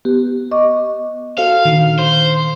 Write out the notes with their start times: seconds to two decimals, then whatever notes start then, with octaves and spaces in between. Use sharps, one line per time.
0.05 B3 G4
0.51 D#5 C#6 D6
1.38 F#4 A4 C5 F5
1.65 A#2 D3 D#3
1.99 C5